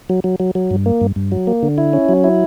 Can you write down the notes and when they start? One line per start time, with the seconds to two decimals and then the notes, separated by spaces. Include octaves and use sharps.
0.10 F#3
0.24 F#3
0.40 F#3
0.55 F#3
0.71 G2
0.86 A#3
1.01 G2
1.16 G2
1.32 F#3
1.47 A#3
1.63 D3
1.78 E4
1.93 C#4
2.09 F#3
2.24 E4